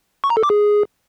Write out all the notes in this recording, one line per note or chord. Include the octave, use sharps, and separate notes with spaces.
C#6
A#5
A4
D6
G#4